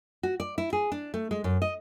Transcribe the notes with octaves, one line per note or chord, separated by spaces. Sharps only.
F#4
D5
E4
G#4
D4
A3
G#3
F#2
D#5